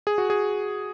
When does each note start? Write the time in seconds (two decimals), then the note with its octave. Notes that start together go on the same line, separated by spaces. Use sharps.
0.07 G#4
0.18 F#4
0.30 G#4